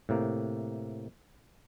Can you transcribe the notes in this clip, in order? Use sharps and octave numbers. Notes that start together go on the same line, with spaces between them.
A2 C3 A#3